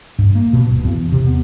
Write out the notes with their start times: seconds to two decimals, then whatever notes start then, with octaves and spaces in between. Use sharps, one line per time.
0.19 G2
0.35 A#3
0.53 B2
0.69 D#1
0.85 E2
1.12 C3
1.27 B3